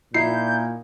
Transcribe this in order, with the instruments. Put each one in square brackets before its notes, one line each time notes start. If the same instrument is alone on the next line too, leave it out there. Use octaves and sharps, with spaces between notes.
[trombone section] A#2 [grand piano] D#4 E4 [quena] G6 [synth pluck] C7